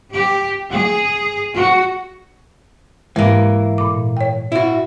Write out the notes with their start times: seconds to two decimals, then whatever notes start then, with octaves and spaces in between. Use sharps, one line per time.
0.13 G4
0.70 G#4
1.51 F#4
3.16 G#2 E3 G#3 A#3
3.78 A#2 D6
4.17 C#5 G5
4.52 E4 F#4